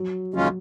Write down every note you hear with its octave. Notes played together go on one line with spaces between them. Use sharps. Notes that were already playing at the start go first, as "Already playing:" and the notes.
Already playing: F#3
D#2 C#3 F#3 G#3 C#4 F4